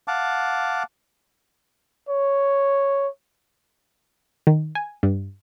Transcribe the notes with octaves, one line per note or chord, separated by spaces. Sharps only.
F5 F#5 A5 D6
C#5
D#3
G#5
G2